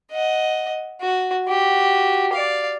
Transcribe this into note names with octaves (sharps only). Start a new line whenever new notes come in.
D#5 F#5
F#4
F#4 G4
D5 F5